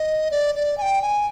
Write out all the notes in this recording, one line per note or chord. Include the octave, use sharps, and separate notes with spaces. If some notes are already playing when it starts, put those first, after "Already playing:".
Already playing: D#5
D5
D5
G#5
G5
G#5